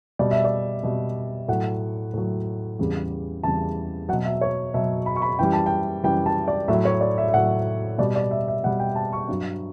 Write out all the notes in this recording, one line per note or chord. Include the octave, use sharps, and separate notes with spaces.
B2 G3 D5
E5
D5
B2 G3
A2 F#3 F#5
A2 F#3
E2 C#3 G3
E2 C#3 G3 A5
B2 F#3 F#5
E5
C#5
B2 F#3 E5
B5
C#6
B5
F#2 E3 G3 G5
A5
G5
F#2 E3 G3 G5
A5
D5
A2 F#3 E5
C#5
D5
E5
E5
A2 F#3 F#5
B2 G3 D5
D5
E5
E5
B2 G3 F#5
G5
A5
C#6
G2 F#3